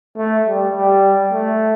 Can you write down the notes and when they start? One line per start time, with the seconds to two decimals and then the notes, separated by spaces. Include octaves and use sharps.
0.17 A3
0.47 G3
0.75 G3
1.32 A3